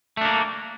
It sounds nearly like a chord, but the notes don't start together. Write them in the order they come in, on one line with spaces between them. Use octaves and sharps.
A3 D4 A#3